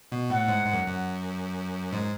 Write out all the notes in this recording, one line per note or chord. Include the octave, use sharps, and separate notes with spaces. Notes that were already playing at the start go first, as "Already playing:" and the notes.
B2
A2 F#5
G#2
G#2
F#2
F#2
G#2